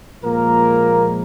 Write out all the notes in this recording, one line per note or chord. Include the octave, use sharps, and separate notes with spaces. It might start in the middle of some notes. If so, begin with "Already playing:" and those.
A#2 F3 G#3 A#3 A#4